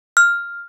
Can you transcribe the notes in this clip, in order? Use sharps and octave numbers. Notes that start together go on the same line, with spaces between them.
F6